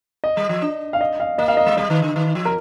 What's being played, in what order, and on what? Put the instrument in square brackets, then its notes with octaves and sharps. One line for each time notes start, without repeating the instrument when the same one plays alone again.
[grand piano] D#5
[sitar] G3
F3
D4
[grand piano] F5
D#5
F5
[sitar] A#3 [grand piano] D#5
[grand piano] F5
D#5
[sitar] G#3
[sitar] G3 [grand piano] D#5
[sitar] D#3
D3
D#3
F3
[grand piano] A#4